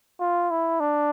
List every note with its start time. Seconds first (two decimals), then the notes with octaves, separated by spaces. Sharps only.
0.20 F4
0.51 E4
0.80 D4